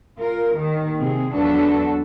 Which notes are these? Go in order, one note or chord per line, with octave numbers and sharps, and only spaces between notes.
F4 A#4
D#2 D#3
C3 C4 G#4
E2 F#3 D4 F#4 A4 B4